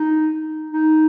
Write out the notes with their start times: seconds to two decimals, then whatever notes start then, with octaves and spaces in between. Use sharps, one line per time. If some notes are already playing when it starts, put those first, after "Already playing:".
Already playing: D#4
0.70 D#4